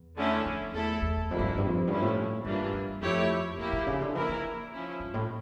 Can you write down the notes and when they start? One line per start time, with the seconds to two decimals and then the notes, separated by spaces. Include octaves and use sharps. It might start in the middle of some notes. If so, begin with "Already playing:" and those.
Already playing: E2
0.16 D3 A3 C#4 E4
0.45 F2
0.74 E2 A3 E4 A4
1.02 E2
1.31 F2 D3 G3 A#3 E4
1.40 G2
1.49 F2
1.58 G2
1.66 F2
1.87 G2 D3 F3 C#4 E4
2.02 A2
2.44 G2 E3 G3 A#3 D4 F4
2.73 G2
3.01 F2 A3 E4 G4 C#5
3.58 F2 A#3 E4 G4
3.73 A#2
3.87 C#3
4.01 D3
4.15 E3 A#3 E4 A#4
4.29 E3
4.72 F3 C#4 E4
5.00 G2
5.14 A2